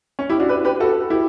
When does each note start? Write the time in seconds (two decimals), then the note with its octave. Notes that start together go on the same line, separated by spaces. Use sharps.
0.19 C#4
0.30 E4 G4
0.40 D4 F#4
0.49 G4 B4
0.65 G4 B4
0.80 F#4 A4
1.10 E4 G4